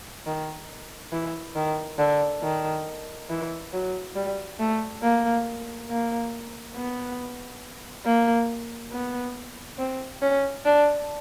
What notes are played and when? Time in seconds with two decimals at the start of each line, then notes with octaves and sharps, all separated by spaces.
0.26 D#3
1.12 E3
1.55 D#3
1.99 D3
2.42 D#3
3.29 E3
3.73 F#3
4.15 G3
4.59 A3
5.02 A#3
5.89 A#3
6.76 B3
8.05 A#3
8.92 B3
9.78 C4
10.22 C#4
10.65 D4